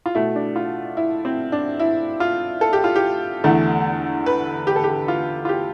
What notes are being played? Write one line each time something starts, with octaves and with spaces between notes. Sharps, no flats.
F4
B2 A3 E4
D4
F4
E4
C4
D4
E4
F4
A4
G4
F4
G4
E2 D3 A3
B4
G4
A4
G4
F4
F4
G4